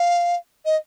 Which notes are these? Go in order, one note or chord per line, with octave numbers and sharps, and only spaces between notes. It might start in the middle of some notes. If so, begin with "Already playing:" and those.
Already playing: F5
D#5